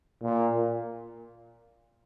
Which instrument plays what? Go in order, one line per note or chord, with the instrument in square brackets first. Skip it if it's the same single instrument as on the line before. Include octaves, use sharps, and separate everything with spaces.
[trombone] A#2